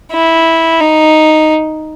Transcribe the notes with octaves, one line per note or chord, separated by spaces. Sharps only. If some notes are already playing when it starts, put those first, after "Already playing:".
E4
D#4